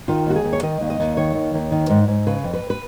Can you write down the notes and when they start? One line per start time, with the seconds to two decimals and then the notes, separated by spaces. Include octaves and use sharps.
0.08 D#3 F4
0.27 D#2 F#4
0.35 G#4
0.44 D#2
0.53 C#5
0.63 D#3 D#5
0.81 D#2
0.90 D#5
1.00 D#2
1.17 D#3 C#5
1.35 D#2
1.54 D#2
1.71 D#3
1.90 G#2
2.08 G#2
2.27 C#3 B4
2.44 F2
2.53 B4
2.70 B4